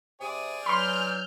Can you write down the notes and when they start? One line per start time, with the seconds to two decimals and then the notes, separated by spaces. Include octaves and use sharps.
0.21 C3 G#4 D5 D#6
0.66 E3 F#3 B5 C6 F6 G6